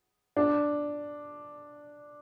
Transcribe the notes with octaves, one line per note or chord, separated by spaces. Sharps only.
D4